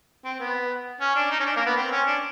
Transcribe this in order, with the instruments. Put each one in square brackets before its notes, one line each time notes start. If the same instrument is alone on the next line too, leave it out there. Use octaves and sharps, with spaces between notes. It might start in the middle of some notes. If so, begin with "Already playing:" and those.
[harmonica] C4
B3
C#4
D4
D#4
C#4
D4
A#3
B3
C4
C#4
D4